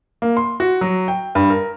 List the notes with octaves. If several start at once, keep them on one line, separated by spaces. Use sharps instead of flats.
A#3
C6
F#4
F#3
G5
G2
A#4